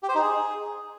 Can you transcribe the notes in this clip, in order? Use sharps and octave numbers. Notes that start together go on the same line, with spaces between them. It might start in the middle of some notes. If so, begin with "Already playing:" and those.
G4
C5
D#4
G#4